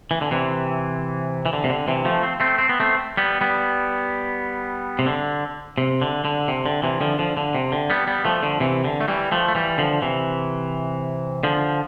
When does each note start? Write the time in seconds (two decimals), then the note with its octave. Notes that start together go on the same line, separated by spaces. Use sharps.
0.11 E3
0.21 D3
0.31 C3 E3
1.46 E3
1.53 D3
1.64 C3
1.70 D3
1.88 C3 E3
2.05 F3 A3
2.23 C4
2.40 A3 C4
2.58 C4
2.69 B3
2.80 A3 C4
3.17 G3 B3
3.41 G3 B3
4.99 C3
5.06 D3
5.78 C3
6.02 D3
6.25 D3
6.48 C3
6.66 D3
6.83 C3 E3
7.01 D3 F3
7.19 D3 F3
7.37 D3
7.55 C3
7.72 D3
7.90 G3 B3
8.07 G3 B3
8.25 F3 A3
8.43 D3 F3
8.60 C3 E3
8.84 D3
9.01 A3
9.08 E3 G3
9.31 F3 A3
9.48 A3
9.55 E3 G3
9.78 D3 F3
10.02 C3 E3
11.43 D3 F3